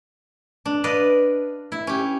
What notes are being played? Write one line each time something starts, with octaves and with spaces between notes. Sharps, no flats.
D4
B4 D5 D#5 F5
E4
C#4 G4